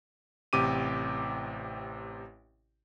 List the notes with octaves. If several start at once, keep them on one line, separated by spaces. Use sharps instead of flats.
A1 C3 G4 D6 D#7